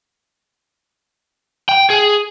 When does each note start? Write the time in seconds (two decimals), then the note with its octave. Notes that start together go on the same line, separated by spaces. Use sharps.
1.69 G5
1.90 G#4